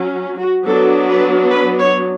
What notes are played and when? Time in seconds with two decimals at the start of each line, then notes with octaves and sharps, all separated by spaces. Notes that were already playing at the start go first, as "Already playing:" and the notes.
Already playing: F#3 C#4
0.38 F#4
0.65 F#3 B3 D4 A4
1.07 B4
1.50 B4
1.79 C#5